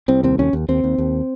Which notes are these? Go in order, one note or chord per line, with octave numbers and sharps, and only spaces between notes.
C2 C4
D#2 C4
D#2 C#4
D#2
D#2 C4
D#2
D#2